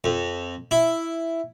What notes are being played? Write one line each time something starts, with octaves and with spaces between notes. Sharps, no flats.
F2
E4